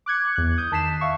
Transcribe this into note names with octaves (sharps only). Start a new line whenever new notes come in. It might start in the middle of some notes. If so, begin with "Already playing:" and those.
D6 F#6 G#6 C#7
E2 F#6
D#6 G6
D#3 A5 B6 C7 E7
E5 F5 C#6